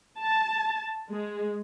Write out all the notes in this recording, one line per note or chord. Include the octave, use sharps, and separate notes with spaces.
A5
G#3